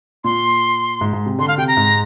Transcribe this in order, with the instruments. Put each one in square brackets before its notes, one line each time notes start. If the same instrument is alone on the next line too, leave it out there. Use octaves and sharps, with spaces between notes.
[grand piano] A#2 [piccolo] C6
[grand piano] G#2
G#2
C3
[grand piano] D3 [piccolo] C6
[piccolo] F5
[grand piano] C3 [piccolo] G5
[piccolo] A#5
[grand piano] G#2